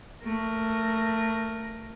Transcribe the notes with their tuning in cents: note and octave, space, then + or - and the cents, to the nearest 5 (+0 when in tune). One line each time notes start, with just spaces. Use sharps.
A3 +20 A#4 +0